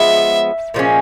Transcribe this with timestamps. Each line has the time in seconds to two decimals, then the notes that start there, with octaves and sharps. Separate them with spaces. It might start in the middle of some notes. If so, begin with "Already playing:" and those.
Already playing: F3 G#3 B3 E5
0.74 A#2 F3 G#3 C#4